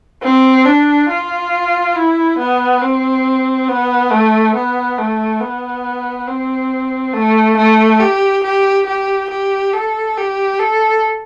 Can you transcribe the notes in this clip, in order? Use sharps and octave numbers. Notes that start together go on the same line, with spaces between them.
C4
D4
F4
E4
B3
C4
B3
A3
B3
A3
B3
C4
A3
A3
G4
G4
G4
G4
A4
G4
A4